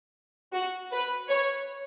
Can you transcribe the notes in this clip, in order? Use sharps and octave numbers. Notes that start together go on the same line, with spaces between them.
F#4
B4
C#5